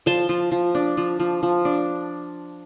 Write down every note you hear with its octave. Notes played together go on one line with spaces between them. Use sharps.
F3 A5 C6
F3
F3
D4
F3
F3
F3
D4